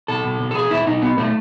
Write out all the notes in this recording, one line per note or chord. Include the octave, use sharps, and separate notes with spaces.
B2 A4
B2
B2
A4
B2 G#4
B2 E4
B2 D#4
B2 B3
B2 A3